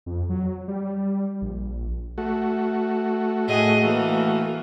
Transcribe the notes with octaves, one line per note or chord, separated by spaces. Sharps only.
F2
F#3
G3
A#1
A3 F#4
A2 G#4 D#5
E3 A#3